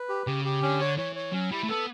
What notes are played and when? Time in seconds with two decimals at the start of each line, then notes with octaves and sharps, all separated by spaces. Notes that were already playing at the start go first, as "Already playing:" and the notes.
Already playing: B4
0.09 G4
0.27 C#3 G4
0.45 G4
0.62 D3 C#4
0.81 C#5
0.98 E3 C#5
1.16 C#5
1.33 F#3 C#4
1.51 G3 E4
1.63 A3
1.69 B3 A4